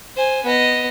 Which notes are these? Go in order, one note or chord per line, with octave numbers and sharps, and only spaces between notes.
C5 G#5
B3 D#5